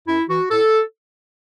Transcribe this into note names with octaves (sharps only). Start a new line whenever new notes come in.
F#2 E4
E3 F#4
A2 A4